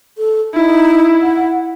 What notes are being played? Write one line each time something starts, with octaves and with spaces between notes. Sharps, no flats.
A4
D#4 E4
F#5